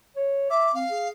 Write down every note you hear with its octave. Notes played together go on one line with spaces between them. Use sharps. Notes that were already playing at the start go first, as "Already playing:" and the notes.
C#5
E5 D6
C4 F5
G#4